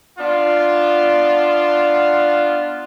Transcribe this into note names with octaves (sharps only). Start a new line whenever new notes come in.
B3 D4 F4